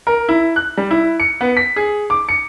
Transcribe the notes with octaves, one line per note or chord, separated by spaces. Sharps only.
A#4
E4
F#6
G3
E4
C#7
B3
B6
G#4
D6
C#7